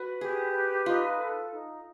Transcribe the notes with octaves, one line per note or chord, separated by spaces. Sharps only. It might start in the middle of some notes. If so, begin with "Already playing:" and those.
Already playing: F#4 B4
G4 G#4
B4
D#4 F4
A4
D#4